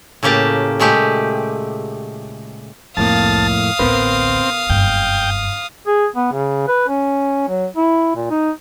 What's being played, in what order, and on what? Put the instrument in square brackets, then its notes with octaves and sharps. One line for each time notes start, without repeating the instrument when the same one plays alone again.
[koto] A2 C#3 A#3 G4 A5
A#2 G#3 A3 G4
[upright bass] C2 [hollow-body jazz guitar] F2 A2 A#3 [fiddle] F5 D#6 [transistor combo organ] A5
[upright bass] A1 D2 [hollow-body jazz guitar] B3 A#4 B4 [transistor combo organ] C4
[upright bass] F#1 G2 [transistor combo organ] G5
[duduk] G#4
B3
C#3
B4
C#4
F#3
E4
A#2
D#4